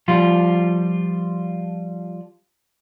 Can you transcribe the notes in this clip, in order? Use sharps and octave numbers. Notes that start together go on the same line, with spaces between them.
F3 G3 F4